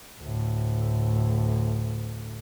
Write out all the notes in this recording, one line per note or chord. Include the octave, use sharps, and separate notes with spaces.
D2 A2